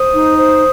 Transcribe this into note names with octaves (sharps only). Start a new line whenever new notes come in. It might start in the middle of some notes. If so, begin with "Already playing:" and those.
Already playing: C5 D#6
D#4
C5